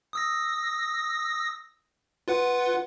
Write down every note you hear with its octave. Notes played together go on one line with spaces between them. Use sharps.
D#6 E6 A#6
F4 B4 F#5